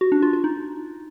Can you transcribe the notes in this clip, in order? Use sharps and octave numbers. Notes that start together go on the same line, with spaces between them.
F#4
D4
F4
F4
D#4